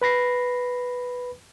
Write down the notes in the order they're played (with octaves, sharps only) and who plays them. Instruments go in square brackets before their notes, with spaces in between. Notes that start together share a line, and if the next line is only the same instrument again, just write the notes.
[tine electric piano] B4 B5 A#6 C7